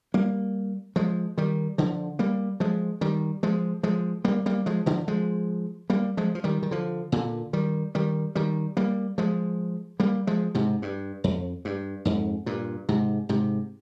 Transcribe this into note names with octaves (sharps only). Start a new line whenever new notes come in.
G3 A#3
F3 G#3
D#3 G3
D3 F3
G3 A#3
F3 G#3
D#3 G3
F3 G#3
F3 G#3
G3 A#3
G3 A#3
F3 G#3
D3 F3
F3 G#3
G3 A#3
F3 G#3
F3
D#3 G3
D#3
D3 F3
A#2 D3
D#3 G3
D#3 G3
D#3 G3
G3 A#3
F3 G#3
G3 A#3
F3 G#3
G#2 C3
G2
F2
G2
F2 G#2
G2 A#2
G#2 C3
G#2 C3